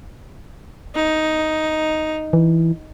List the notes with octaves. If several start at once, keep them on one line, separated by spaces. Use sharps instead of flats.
D#4
E3